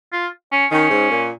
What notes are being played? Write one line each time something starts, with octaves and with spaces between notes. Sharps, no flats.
F4
C#4
D#3 C#4
G#2
A#2